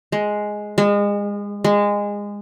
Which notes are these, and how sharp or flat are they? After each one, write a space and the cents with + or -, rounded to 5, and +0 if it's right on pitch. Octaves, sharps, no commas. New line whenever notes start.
G#3 +5
G#3 -30
G#3 -20